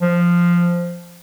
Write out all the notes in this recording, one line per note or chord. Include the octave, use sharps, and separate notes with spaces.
F3